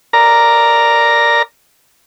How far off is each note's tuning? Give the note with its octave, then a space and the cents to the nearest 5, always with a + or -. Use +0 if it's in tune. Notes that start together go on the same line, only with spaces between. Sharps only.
A#4 +0 D5 +0 A#5 +0